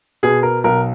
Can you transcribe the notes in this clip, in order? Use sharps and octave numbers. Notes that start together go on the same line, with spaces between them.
B2 G#4
A#4
B1 A#4